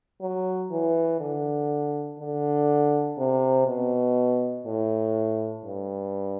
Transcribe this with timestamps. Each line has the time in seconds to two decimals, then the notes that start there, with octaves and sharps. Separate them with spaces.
0.21 F#3
0.71 E3
1.20 D3
2.19 D3
3.18 C3
3.67 B2
4.66 A2
5.65 G2